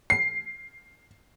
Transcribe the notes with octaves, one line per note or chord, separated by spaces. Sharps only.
C7